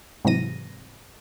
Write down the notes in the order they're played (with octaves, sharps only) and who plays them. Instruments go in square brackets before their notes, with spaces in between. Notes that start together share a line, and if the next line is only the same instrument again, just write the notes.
[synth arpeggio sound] G#2 C3 E3 F#3 A#6 D#7